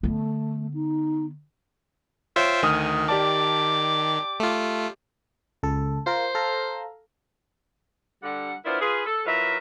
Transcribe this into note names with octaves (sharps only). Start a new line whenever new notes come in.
D3 A3 B3
D#4
F4 C5 C#5 E5 G5
D2 D#3 G#5 D#6 F6
G4 D5 A5 D6
A3 F4
C#2 A4
F4 A#4 C5
A4 F5 A#5
D3 G3 F#5
B3 D4 E4 F4 A#4 C5
F4 G#4 B4
A4
F#3 E4 F4 A#4 B4 E5